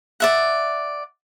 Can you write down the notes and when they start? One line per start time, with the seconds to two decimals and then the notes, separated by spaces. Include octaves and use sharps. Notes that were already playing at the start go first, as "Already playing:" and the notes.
0.20 D5 E5 F#5